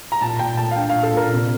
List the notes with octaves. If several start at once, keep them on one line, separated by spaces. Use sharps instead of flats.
A#5
A#2 A5
A#2 G5
A3 A5
F5
D4 G5
A#2 F5
A4
A#2 A#4
C3